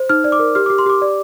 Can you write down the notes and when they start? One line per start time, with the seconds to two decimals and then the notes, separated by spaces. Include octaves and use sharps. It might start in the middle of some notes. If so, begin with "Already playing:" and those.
Already playing: C5
0.09 D#4 F6
0.24 D5
0.32 D6
0.39 A#4
0.55 G4 F6
0.66 G4 D6
0.78 C6
0.86 G4 D6
1.02 D5